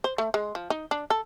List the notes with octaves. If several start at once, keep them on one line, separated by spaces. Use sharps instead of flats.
C5
A3
G#3
F3
D#4
D4
A4